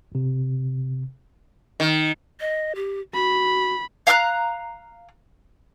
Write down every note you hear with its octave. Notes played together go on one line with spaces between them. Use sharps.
G1 C3
D#3
D#5
G4
F#4 B5
F5 A#5 F6 F#6